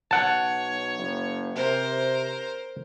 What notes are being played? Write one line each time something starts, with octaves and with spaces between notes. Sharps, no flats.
B1 C#5 F#5 A5
F#1
C3 A#4 C5